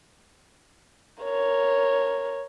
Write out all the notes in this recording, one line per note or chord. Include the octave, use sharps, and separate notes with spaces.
A#4 C#5